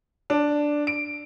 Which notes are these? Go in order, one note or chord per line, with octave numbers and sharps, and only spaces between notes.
D4
D7